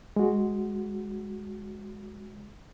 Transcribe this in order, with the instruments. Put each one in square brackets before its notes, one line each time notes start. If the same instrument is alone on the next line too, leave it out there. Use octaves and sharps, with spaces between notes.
[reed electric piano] G#3 F#4